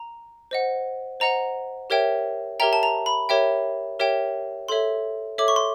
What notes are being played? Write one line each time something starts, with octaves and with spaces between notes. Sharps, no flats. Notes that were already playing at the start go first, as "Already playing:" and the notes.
Already playing: A#5
C5 D#5 F#5
C5 D#5 F#5 A#5
G4 A#4 C#5 E5 G5
G4 A#4 C#5 E5 G5 A#5
A5
A#5
B5
G4 A#4 C#5 E5 G5
G4 A#4 C#5 E5 G5
A4 C#5 E5 C6
A4 C#5 E5 D6
C#6
C6